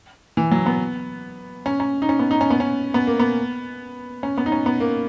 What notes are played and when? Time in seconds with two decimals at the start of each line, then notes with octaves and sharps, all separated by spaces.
0.37 E3
0.51 F#3
0.66 B3
1.66 C#4
1.80 C#4
2.02 D#4
2.09 C#4
2.19 B3
2.31 D#4
2.41 C#4
2.50 B3
2.60 C#4
2.94 B3
3.07 A#3
3.19 B3
4.23 C#4
4.38 B3
4.46 D#4
4.52 C#4
4.66 B3
4.80 A#3